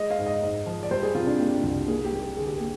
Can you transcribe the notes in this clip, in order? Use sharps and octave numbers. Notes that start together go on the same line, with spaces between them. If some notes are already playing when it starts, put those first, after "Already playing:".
Already playing: G#3 D#5
F5
G#2
D#5
G#2 D#5
F3
D5
G3 C5
G#4
C3 F4
D4
A#3 G4
C2
A#3 G#4
G4
G3
G4
D3 G#4
G4
A#3 G#4